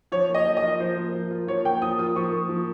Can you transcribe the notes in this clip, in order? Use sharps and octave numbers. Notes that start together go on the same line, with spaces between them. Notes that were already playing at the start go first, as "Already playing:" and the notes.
F3 C#5
A#3 D#5
F3
D#5
F4
F3 C5
A#3
F3
F4
F3 C#5
A#3 G5
F3 D#6
F4 D#6
F3 C#6
A#3
F3